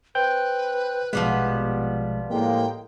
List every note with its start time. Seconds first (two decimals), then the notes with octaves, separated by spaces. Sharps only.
0.15 B4 C5 G5 G6
1.13 A#1 B2 F3 G3 G#3 B3
2.31 A2 G#3 A#3 G5